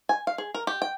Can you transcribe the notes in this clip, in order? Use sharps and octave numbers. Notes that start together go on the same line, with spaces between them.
G#5
F5
G#4
A#4
G4
G5